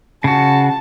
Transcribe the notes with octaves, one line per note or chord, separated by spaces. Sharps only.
C#3 F#4 A5